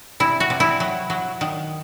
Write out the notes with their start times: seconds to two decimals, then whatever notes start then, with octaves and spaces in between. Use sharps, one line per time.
0.20 C3 E4
0.40 F#4
0.50 C3
0.60 E4
0.80 F#3
1.10 F#3
1.41 D#3